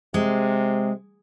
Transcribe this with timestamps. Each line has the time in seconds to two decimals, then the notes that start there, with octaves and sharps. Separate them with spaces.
0.14 C3 G#3